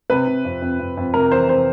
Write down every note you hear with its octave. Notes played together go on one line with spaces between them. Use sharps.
C3 B4
C3
F2
F2
F2
F2
C3 A#4
E3 C5
C3 C5